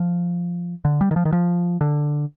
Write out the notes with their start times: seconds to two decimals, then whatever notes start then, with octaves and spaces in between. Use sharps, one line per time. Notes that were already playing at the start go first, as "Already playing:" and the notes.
Already playing: F3
0.85 D3
1.01 G3
1.11 D#3
1.16 F3
1.25 D#3
1.33 F3
1.81 D3